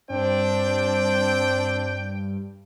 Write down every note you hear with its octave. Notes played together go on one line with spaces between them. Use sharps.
G2 C4 D4 G5